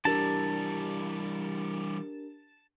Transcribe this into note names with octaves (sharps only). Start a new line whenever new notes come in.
E3 G3 D4 G4 A#4 A5